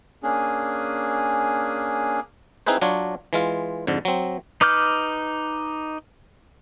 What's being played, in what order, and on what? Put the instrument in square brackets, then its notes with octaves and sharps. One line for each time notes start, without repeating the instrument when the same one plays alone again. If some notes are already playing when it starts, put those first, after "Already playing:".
[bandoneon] A#3 C#4 D4 G#4
[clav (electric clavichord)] C4 D#4 E4 G#4 B4 C5
F#3 D4 F4 C#5
E3 G#3 F4
F2 G#2 D3
F#3 C4
[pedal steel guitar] D#4 B4 D6 F6 G6